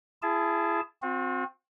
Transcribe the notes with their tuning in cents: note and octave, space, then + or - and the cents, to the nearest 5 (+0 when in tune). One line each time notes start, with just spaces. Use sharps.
E4 +30 G#4 +0 A5 -15
C4 +0 F#4 -45